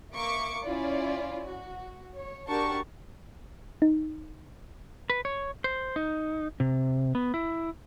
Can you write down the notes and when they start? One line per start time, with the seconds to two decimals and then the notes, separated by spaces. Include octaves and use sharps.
0.12 A#3 E5 C#6 D6 C#7
0.63 C#4 E4 F4 D5
1.46 F#4
2.15 C#5
2.48 D4 F#4 G4 A#4 A5 C#6
3.82 D#4
5.10 B4
5.25 C#5
5.64 C5
5.96 D#4
6.60 C3
7.15 B3
7.34 E4